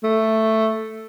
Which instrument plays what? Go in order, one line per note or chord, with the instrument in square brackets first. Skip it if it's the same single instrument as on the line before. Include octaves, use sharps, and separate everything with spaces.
[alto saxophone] A3